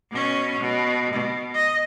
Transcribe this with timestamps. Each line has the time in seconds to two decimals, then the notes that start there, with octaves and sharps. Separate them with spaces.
0.11 B2 C#4
0.60 B2
1.13 B2
1.54 D#5